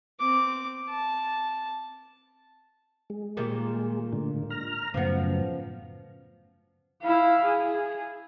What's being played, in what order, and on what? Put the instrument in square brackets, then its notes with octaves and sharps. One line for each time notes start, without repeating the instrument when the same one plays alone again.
[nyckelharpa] C4 D6
A5
[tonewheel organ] G#3
[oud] A#2 D#3 G3
[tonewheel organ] A2 D3
A#5 F6
[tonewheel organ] F#2 A2 C#3 [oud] F3 B3
[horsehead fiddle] E4 F5
G#4